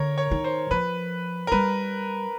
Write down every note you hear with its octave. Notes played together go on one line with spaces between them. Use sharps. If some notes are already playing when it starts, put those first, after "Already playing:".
Already playing: D3 A#4 C#5
C#5
D#3
C5
F3 B4
A#4
G3 B4